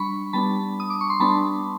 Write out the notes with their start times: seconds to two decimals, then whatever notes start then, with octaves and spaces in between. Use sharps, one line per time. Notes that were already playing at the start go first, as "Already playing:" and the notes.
Already playing: G3 D4 B5 C#6
0.33 G3 B3 D4 A5 B5
0.80 D#6
0.90 D6
1.01 C#6
1.10 C6
1.20 G3 B3 D4 A5 B5